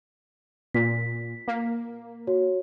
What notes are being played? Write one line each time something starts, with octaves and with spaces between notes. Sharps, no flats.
A#2 B6
A#3
F#4 C#5